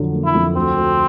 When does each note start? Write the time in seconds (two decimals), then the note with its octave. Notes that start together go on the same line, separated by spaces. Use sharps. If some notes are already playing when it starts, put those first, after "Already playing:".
Already playing: F2 D3 F#3
0.14 A#3
0.25 E4
0.35 F2
0.55 D2 C4
0.76 D2